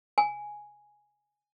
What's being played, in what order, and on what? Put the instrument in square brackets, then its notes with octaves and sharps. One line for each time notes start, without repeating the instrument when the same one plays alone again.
[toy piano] G#5